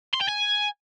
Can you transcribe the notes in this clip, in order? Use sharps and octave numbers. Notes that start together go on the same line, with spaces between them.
C6
G5
G#5